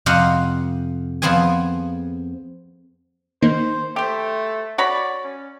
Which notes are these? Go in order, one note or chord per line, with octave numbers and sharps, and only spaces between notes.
F2 C3 C5 D#5 F5 F#5
F2 F3 B3 C4 G#4 G#5
D#3 A#3 D#4 C5
A3 G4 C5
F#4 C#5 D5 B5
C#4